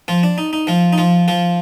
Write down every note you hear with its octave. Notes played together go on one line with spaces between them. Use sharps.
F3 F4
D4
D#4
D#4
F3 F4
D#4
F3 F4
F3 F4